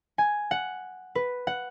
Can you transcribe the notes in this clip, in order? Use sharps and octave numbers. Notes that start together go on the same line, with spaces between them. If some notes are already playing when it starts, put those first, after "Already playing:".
G#5
F#5
B4
F#5